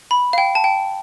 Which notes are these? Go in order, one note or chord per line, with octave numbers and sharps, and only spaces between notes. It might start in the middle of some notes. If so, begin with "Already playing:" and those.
B5
F5
G5
A5
G5